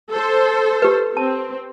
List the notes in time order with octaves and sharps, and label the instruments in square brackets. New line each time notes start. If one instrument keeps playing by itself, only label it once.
[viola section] A4 C5
[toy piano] G4 B4
[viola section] C4 [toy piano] A5